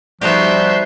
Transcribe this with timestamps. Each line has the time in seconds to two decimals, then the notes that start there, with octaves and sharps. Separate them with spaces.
0.21 F3 G3 B3 D#4 F#4 G4 E5 C6